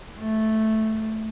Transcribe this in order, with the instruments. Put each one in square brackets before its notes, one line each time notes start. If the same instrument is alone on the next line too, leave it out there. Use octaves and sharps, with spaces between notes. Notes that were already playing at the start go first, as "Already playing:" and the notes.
[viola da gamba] A3